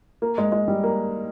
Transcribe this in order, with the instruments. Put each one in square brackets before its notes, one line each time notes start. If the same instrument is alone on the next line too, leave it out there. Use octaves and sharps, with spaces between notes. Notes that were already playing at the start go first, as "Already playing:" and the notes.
[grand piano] A#3
G#3
G#3
G3
A#3